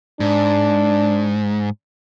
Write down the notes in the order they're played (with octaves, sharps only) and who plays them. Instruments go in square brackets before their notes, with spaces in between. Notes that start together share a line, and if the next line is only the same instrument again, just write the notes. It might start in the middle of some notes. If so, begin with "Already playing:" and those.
[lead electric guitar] G#2 [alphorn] D4